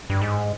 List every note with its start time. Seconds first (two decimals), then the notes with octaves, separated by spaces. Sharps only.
0.10 G2
0.21 G#2